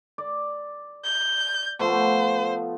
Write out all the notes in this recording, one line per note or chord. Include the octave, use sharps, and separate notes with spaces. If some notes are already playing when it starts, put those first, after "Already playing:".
D5
G6
F3 A3 B3 C5